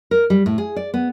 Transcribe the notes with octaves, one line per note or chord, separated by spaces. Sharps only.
A#4
G3
A2
G#4
D5
B3